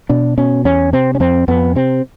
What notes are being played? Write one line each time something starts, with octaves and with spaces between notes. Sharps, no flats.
B2 D4
B2 C#4
E2 C#4
C3 C4
C#4
F2 C4
F2 B3
C3 C4